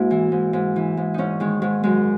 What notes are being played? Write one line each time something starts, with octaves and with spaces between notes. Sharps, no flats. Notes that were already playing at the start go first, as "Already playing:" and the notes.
Already playing: G#2 A#3 E4 F#4
E3
G#2
G#2
E3
G#2
G#2 C#4 D#4
D#3 G#3
G#2 G#3
F#2 G#3